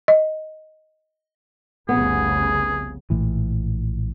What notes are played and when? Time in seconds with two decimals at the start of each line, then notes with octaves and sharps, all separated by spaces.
0.08 D#5
1.89 F1 C2 C#3 B3 G#4
3.10 A#1 A2 E3